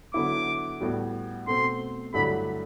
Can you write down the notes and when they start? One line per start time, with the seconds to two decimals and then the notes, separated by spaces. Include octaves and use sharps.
0.14 D3 F#3 B3 E4 D6
0.81 A2 G3 B3 F#4
1.47 B2 A3 C4 C6
2.14 G2 D3 F#3 A3 E4 B5